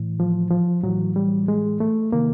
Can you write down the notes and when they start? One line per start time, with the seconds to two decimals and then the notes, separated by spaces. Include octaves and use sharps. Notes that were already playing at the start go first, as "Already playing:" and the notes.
Already playing: A2 E3
0.20 F3
0.51 F3
0.84 A2 E3 F#3
1.16 G3
1.48 G#3
1.80 A3
2.12 C3 D#3 A#3